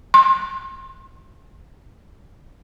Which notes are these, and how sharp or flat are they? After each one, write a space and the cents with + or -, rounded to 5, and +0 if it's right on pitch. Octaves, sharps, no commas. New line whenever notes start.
C6 +30